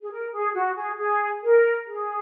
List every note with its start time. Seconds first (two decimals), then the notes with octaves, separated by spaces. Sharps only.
0.01 G#4
0.11 A#4
0.33 G#4
0.54 F#4
0.76 G#4
0.98 G#4
1.42 A#4
1.86 G#4